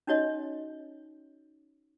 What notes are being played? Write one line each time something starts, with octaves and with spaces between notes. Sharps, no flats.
C#4 D#4 F#4 C#5 D#5